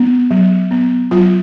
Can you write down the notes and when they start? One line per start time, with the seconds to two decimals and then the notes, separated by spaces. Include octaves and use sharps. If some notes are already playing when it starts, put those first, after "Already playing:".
Already playing: B3
0.31 F#3
0.71 B3
1.11 F#3 F4